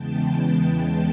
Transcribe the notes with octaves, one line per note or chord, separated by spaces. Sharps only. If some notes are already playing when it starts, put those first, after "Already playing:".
Already playing: E2 C#3 E3 G#3 B3 G5 A5